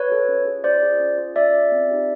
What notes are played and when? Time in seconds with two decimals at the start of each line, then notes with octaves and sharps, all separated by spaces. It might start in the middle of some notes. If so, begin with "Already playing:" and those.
Already playing: B4 C#5
0.09 F#4 A4
0.28 C#4
0.45 F4 G#4
0.64 C#4 C5 D5
0.82 F4 G#4
1.00 C#4
1.18 F4 G#4
1.36 C#4 D5 E5
1.54 F4 G#4
1.72 C4
1.90 D#4 G4